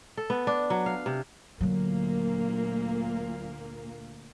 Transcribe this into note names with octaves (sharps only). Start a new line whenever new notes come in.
A4
B3
D4
F#3
F5
C3
D2 A#2 D3 F#3 A#3